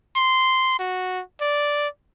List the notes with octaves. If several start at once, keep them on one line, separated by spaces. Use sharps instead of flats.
C6
F#4
D5